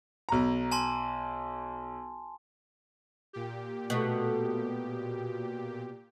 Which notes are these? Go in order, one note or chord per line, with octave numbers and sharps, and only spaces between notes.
B1 A#5
G#5 A5 C6
A#2 G4
B2 A3